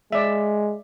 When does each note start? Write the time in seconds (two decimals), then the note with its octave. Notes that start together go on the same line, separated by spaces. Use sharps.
0.12 G#3 D5 E5